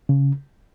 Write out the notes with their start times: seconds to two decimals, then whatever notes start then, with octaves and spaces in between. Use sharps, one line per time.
0.09 C#3